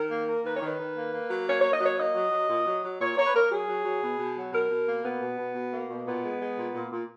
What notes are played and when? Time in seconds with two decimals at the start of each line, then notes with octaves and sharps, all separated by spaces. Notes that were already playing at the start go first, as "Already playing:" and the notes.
Already playing: D#3 A#4
0.10 A#3
0.27 A#3
0.44 D#3 B4
0.55 C#5
0.62 D#3 B4
0.78 D#3
0.96 A#3
1.13 A#3
1.29 F#3
1.47 A#3 C#5
1.59 A#3 C#5
1.72 D#5
1.80 F#3 C#5
1.97 A#3 D#5
2.14 F#3
2.31 F#3
2.48 A#2
2.65 F#3
2.83 F#3
3.00 A#2 C#5
3.16 A#3 C#5
3.26 B4
3.34 A#3 A#4
3.50 F#3 G#4
3.68 F#3
3.84 F#3
4.02 B2
4.19 B2
4.36 F#3
4.53 B2 A#4
4.70 B2
4.87 A#3
5.04 B2 B3
5.22 B2
5.38 B2
5.55 B2
5.72 A#3
5.89 B2
6.05 A#2 B3
6.23 G#3
6.40 G#3
6.57 A#2
6.74 A#2
6.91 A#2